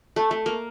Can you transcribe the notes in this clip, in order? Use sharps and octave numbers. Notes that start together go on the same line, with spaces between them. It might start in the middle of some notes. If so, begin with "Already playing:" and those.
A3
A3
A#3